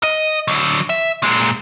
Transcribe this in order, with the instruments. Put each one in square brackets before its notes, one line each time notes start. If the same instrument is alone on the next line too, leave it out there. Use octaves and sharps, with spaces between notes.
[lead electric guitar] D#5
D3 F#3
E5
A#2 G#3